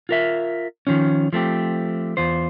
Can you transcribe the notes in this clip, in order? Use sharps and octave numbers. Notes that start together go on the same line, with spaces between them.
F4 A#4 E5
D#3 F3 C#4
F3 A3 C4 G4
E2 F4 C5